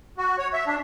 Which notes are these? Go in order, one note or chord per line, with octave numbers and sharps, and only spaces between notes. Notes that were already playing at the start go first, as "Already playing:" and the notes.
F#4
C#5
E5
D4